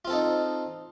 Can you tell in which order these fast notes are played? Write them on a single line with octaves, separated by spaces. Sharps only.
F4 C4 A4 D#4